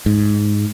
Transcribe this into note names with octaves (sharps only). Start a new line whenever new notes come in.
G#2